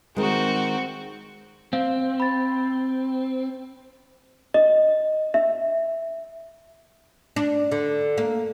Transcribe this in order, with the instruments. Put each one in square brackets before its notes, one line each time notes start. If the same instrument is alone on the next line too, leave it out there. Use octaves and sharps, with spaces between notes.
[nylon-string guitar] D#3 G#3 [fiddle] C4 F#4
[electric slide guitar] C4 [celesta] F5
[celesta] B5 A6
D#5
E5
[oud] D4
D3
A#3